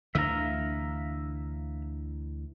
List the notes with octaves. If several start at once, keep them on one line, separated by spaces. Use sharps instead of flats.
D2 D3 E3 E5 F5 A#5